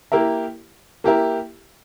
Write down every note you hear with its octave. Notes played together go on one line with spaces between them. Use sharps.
A#3 E4 G4 A#4 E5
A#3 E4 G4 A#4 E5